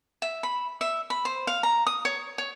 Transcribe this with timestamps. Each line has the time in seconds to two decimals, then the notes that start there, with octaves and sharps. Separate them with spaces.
0.22 E5
0.43 B5
0.81 E5
1.10 B5
1.25 C5
1.47 F5
1.63 A#5
1.87 D#6
2.05 C#5
2.38 C#5